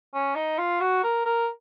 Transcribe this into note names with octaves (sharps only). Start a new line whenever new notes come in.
C#4
D#4
F4
F#4
A#4
A#4